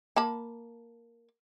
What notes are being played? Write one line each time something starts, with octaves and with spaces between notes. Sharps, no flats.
A#3 A5 B5